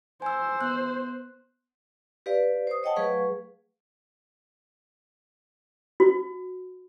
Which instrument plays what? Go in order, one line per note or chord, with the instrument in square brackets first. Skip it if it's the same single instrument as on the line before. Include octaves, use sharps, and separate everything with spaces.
[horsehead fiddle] C5 [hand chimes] G#5 E6
[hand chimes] B3 F#6
[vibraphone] G4 B4 D5 F5
C5 D#6
C#5 D#5 F#5 G5 A5
F#3 A3 G#4 B4 F5 C#6
[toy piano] F#4